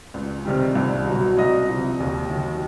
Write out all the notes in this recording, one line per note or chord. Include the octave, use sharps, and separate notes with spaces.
C#2
C3 D#3 G3
C2
B2 F#3
C2 D#5
C3 F3
D#2
D#3 F#3